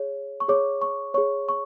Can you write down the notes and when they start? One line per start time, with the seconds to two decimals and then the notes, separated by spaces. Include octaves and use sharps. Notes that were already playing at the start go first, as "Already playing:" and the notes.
Already playing: G#4 C#5
0.40 C#6
0.48 G#4 C#5 D6
0.82 C#6
1.14 G#4 C#5 C#6
1.49 C#6